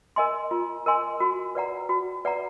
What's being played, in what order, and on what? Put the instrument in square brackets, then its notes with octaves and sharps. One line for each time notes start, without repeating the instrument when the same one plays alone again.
[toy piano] A#4 D#5 G#5 C6
F4
A#4 D#5 G#5 C6
F#4
B4 D5 F#5 A#5
F#4
B4 D5 F#5 A#5